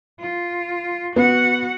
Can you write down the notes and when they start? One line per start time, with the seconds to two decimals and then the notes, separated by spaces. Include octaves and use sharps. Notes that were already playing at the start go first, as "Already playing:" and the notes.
0.20 F4
1.16 B3 F#4 F#5